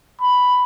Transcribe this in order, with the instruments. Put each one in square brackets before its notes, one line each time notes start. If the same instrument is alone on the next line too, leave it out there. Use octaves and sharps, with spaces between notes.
[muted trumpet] B5